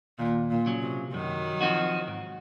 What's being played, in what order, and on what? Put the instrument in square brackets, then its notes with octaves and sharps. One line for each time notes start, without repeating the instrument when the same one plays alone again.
[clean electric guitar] D#2 [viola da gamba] A#2
[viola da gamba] A#2
[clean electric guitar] C#3 F#3
[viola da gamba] C3
[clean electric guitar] F#2 [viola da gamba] D#3 F#3
[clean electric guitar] F3 C4 D#4 F#4
G#2